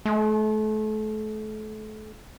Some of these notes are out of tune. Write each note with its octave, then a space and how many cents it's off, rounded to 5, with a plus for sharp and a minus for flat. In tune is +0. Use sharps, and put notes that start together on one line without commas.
A3 -35